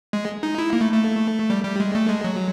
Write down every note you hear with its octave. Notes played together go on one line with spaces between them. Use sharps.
G#3
D#4
E4
A#3
A3
A3
G3
G3
G#3
A3
G#3
F#3